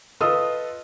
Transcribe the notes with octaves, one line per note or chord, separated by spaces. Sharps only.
F4 A4 B4 D#5 D#6 E6